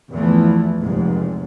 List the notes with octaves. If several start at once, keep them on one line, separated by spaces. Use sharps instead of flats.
E2 G2 E3 F3 A3
F1 C#2 G#2